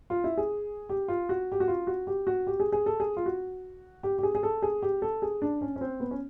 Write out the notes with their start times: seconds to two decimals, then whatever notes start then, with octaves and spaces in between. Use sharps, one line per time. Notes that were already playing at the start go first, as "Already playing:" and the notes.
0.10 F4
0.24 E4
0.37 G#4
0.89 G4
1.08 F4
1.29 F#4
1.52 G4
1.60 F#4
1.68 F4
1.87 F#4
2.07 G4
2.27 F#4
2.47 G4
2.60 G#4
2.72 G#4
2.86 A4
3.00 G#4
3.17 F4
3.26 F#4
4.03 G4
4.19 G4
4.23 G#4
4.35 G#4
4.43 A4
4.62 G#4
4.82 G4
5.02 A4
5.22 G#4
5.42 D4
5.61 C#4
5.76 C#4
5.81 C4
6.00 B3
6.11 C#4